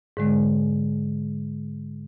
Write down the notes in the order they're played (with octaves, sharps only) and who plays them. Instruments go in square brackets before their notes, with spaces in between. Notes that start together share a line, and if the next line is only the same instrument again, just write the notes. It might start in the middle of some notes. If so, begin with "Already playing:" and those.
[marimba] G#2 D3 G#3